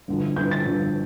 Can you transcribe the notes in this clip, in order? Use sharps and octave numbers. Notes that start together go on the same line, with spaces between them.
A1 G2 D3 F3
A1 G2 D3 F3 G6
A6
A1 G2 D3 F3